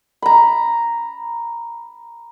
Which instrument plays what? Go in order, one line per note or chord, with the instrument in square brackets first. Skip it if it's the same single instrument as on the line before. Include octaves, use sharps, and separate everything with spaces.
[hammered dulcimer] A#5 B5